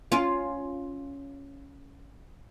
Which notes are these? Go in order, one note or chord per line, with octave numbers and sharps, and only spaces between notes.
C#4 F4